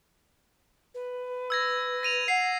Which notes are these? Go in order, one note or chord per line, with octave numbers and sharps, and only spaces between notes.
B4
E6 G#6 A#6
A#6 D#7 F7
F#5 C7